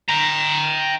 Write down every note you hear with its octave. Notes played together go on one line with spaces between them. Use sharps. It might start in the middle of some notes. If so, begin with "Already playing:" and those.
G5 A#5